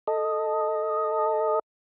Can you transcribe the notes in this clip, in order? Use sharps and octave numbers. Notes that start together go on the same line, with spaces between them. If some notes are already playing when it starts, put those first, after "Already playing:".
A4 D#5